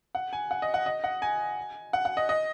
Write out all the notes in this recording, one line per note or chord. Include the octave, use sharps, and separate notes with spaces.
F#5
G#5
F#5
D#5
F#5
D#5
F#5
G#5
F#5
F#5
D#5
D#5